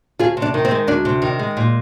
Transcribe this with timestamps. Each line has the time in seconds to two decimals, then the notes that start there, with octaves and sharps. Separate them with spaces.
0.19 D2 F4 G#4
0.37 C3
0.42 D4
0.54 D#3
0.65 C4
0.71 G#3
0.87 D2 D4
1.05 C3
1.22 D#3
1.39 G#3
1.57 A#2